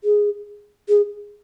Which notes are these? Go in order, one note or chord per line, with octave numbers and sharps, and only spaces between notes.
G#4
G#4